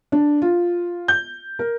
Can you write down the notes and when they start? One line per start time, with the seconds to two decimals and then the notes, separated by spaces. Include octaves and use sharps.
0.12 D4
0.42 F4
1.08 G6
1.59 A#4